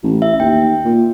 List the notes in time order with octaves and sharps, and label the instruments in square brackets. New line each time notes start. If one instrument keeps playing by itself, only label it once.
[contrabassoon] A1
[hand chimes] E5
[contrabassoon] D#2 [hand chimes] G5
[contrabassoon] A#2